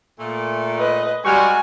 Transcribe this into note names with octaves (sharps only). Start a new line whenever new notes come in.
A#2 A3
B4 D#5
G3 G#3 F#4 G#5 C#6 F6